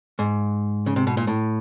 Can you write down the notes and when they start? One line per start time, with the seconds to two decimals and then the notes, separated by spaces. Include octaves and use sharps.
0.19 G#2
0.86 C#3
0.96 C3
1.07 B2
1.17 A#2
1.27 A2